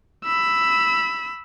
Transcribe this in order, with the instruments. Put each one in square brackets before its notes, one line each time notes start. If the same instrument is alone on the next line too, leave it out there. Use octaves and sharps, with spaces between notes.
[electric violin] B5 E6